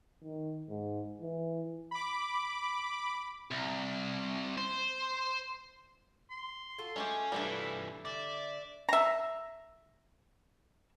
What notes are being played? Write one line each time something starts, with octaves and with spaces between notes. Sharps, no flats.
D#3
G#2
E3
B5 D6
C2
C5
C6
F4 F#4 A4
G#3 A3 C#4 G4
G2 E3 G3 A3 D4 E4
D3 D5 E5
E5 A#5